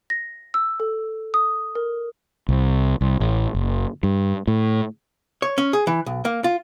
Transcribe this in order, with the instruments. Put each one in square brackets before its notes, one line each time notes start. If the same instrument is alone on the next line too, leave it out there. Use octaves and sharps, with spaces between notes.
[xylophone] A#6
E6
A4
D#6
A#4
[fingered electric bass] C2
C2
A1
F#1
G2
A2
[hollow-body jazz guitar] C#5
C#4
G#4
E3
B1
A#3
F4